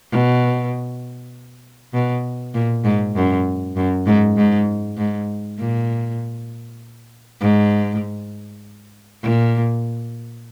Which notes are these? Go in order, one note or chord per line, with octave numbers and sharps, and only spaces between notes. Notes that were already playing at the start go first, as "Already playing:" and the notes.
B2
B2
A#2
G#2
F#2
F#2
G#2
G#2
G#2
A#2
G#2
A#2